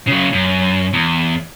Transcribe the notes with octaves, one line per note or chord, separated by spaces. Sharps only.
C#3 F#3
F#2
E2